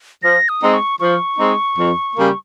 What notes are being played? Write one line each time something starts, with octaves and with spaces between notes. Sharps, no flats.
F3 A#6
D#6
G#3 C4 D#4
C#6
F3 C#6
G#3 C4 D#4
F2
C#3 G3 A#3